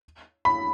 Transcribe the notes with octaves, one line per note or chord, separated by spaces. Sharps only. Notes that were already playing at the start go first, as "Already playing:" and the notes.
B5